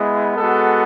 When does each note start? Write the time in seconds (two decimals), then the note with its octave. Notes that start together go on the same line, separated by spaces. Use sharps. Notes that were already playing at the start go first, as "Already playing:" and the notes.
Already playing: G#3 B3 E4
0.36 G#3 B3 F#4 A4